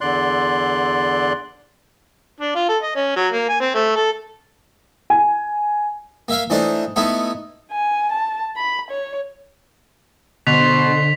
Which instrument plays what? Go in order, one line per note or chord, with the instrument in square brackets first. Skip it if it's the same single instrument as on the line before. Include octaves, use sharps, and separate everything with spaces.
[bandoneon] E2 D3 D5 C6 F#6
[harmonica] D4
F4
A4
D#5
C#4
F#3
A#3
G#5
C4
A3
A4
[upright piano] G#5
[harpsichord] A#3 E5 F5
E3 A3 D4 D#4 C5
A3 B3 D#4 E4
[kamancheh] G#5
A5
B5
C#5
[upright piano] B2 [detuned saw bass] D3 [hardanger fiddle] C5 C6 [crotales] B6 F7